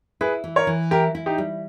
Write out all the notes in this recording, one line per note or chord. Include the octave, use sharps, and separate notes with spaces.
E4 G#4 B4
E3
A#4 C#5
E3
E4 G4 A#4
E4
D#4 G4
G3